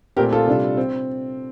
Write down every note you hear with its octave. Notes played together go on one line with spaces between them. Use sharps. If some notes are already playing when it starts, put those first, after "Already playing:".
A#2 A3 C4 G4 A#4
F4 A4
C3 G3 D4
C4